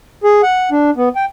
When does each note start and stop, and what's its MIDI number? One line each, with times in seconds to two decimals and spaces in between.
0.24 0.42 68
0.43 0.70 78
0.71 0.90 62
0.96 1.09 59
1.15 1.25 79